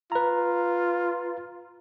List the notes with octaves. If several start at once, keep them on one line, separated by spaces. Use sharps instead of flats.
F4 B4 A#5